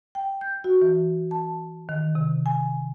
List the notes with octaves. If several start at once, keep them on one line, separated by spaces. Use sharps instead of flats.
G5
G6
F#4
E3
A5
D#3
C3
G#5